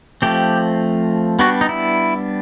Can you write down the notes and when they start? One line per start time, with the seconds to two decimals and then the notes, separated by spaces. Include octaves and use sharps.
0.22 F3 A3 C4 G4
1.39 G3 B3 D4 F#4
1.61 D#4
1.69 E4